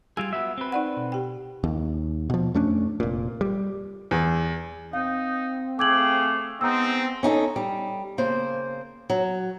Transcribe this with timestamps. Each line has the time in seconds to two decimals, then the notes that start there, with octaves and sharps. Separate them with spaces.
0.17 G3 F4 G#4 E6 G#6
0.33 B3 F#4 E5
0.58 C4 B4
0.72 D#4 D5 F#5
0.97 B2
1.12 G4 G5
1.64 D#2
2.30 B2 F3
2.54 F2 A3 C#4 D4
3.00 F1 A#2
3.41 G3
4.11 E2
4.93 C4 D#4 F5
5.79 A3 G#4 F5 G5 D6 G#6 F#7
6.61 G#3 B3 C4 D#4 A#5 E6
7.23 C#4 D#4 G4 A4
7.56 G3
8.18 C#3 A#3 C5
9.10 F#3